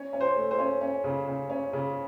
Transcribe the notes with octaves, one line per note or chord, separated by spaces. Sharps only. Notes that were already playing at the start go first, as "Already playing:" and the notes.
Already playing: C#4 C#5
C#4
C5
A3
C5
C#4
C#4
C#3
C#3
C#4
C#3